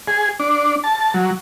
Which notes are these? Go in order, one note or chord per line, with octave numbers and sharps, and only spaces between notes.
G#4
D4
A5
F#3